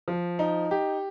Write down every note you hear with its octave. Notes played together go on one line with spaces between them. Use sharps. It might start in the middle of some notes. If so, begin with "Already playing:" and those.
F3
D#4
G4